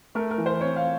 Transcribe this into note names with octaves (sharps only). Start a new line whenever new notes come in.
A3 A#4
A#4
E3
C5
C4 C#5
F5